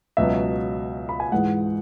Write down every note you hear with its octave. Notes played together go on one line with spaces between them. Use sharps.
C#2 B2 F#3 E5
B5
G#5
G#2 E3 G#3 F#5